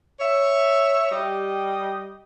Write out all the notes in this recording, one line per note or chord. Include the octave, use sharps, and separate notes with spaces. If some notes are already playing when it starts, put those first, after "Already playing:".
C#5 E5
G3 G4 D#5